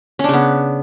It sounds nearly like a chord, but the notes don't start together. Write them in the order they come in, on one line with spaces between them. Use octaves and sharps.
C#4 D4 C#3 B3